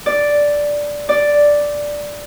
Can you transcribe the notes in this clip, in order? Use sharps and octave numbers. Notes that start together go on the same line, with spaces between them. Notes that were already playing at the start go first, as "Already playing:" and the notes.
D5
D5